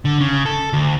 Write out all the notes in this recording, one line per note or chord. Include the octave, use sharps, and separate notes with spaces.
D3
C#3
A4
D2